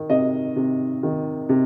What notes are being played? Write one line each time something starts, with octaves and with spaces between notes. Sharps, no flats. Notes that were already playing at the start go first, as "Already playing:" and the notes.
Already playing: D#3
C3 D#5
C3
D#3
C3